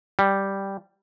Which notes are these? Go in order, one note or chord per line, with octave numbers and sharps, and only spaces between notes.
G3